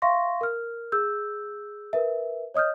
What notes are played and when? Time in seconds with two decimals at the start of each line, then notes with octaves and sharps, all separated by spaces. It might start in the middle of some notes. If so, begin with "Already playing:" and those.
0.02 E5 F5 C6 C#6 A#6
0.41 A#4 F6
0.92 G#4 E6 G6
1.93 A#4 B4 E5
2.54 C#5 D#5 D#6 F6 G6